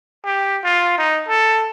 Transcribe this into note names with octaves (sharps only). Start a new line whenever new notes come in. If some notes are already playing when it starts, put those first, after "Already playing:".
G4
F4
D#4
A4